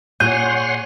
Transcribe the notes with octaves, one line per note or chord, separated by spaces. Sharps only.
A#2 G#4 C#5 F#5 C6 G6 D#7